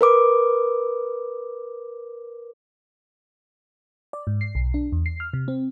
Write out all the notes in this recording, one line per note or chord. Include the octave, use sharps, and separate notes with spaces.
A#4 B4 D6 D#6
D5
G#2
C7
B1
D4
E2
C7
F6
C3
C4